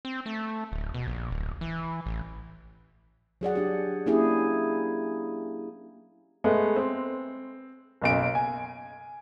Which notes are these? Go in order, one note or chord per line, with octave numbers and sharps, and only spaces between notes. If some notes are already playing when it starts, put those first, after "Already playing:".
C4
A3
D1
B2
A#1
D1
E3
A1
F#3 G#4 D5 F#5
D4 G4
A#3 C#4 D4 E4 G4 G#4
G#3 A3 B3
C4
F#1 B1 D7
G#5